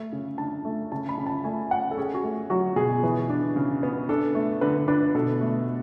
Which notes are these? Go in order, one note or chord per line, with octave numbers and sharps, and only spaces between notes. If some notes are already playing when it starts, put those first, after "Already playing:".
Already playing: A3
C#3
D4 A5
A3
C#3 A5
B5
C#3
A5
A3 G#5
C#4 F#5
A4
C#4 G#4
F#4
A3
F#3 F#4
B2 G#4
E3 B4
D4
C#3
B3
D4 A4
A3
D3 B4
D4 B4
B2 A4
A3